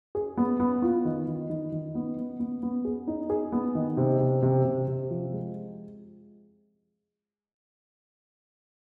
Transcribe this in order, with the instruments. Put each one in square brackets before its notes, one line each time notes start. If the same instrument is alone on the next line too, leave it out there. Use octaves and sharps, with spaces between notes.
[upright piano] G#4
B3
B3
F4
D#3
D#3
D#3
D#3
B3
B3
B3
B3
G#4
D#4
G#4
B3
D#3
C3
C3
C3
C3
C3
F3
G#3